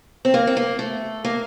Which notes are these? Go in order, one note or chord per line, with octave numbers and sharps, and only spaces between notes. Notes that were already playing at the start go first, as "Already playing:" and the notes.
C4
A#3
C4
A#3
A3
A#3